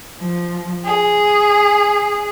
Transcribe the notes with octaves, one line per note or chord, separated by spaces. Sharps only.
F3
G#4